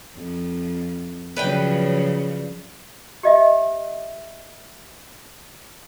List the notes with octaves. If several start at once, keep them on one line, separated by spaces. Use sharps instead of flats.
F2
C#3 F3 F#3 B4 D5 G5
G4 D#5 E5